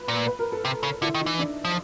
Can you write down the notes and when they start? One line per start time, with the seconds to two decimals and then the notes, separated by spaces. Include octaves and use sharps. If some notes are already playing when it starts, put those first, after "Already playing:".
Already playing: B4
0.08 A#2
0.27 B4
0.39 A#4
0.52 A4
0.65 C3
0.83 C#3
1.02 D3 E4
1.14 D#3
1.21 D#4
1.26 E3
1.39 D4
1.65 F3